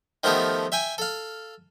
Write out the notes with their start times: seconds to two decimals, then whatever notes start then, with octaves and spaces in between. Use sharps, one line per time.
0.24 D#3 F3 A3 B3 G4 A4
0.72 E5 G5 G#5
0.98 A4 F5